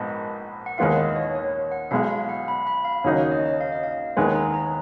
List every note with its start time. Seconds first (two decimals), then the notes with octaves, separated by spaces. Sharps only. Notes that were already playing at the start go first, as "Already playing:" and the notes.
Already playing: A#1 G#2 B3 D#5
0.66 F#5
0.78 D#2 D#3 G#3 B3 F4 F5
0.97 D#5
1.16 C#5
1.35 C#5
1.72 F#5
1.91 B1 B2 G#3 F5
2.10 F5
2.29 F#5
2.48 B5
2.67 B5
2.85 F5
3.04 D#2 C#3 F#3 A#3 D#4 C#5
3.18 C#5
3.31 D#5
3.46 D#5
3.61 F5
3.72 D#5
3.83 F5
4.17 D#2 D#3 G#3 B3 G#5
4.35 A#5
4.54 A#5